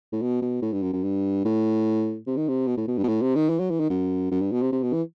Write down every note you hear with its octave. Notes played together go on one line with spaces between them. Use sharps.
A2
B2
B2
A2
G2
F#2
F#2
G2
A2
C3
D#3
C3
B2
A2
B2
G2
B2
A2
C3
D#3
E3
F#3
E3
D#3
F#2
F#2
G2
B2
C3
C3
B2
E3